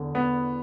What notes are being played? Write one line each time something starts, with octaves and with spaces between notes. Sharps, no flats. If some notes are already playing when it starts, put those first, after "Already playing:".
Already playing: E2 D3
B3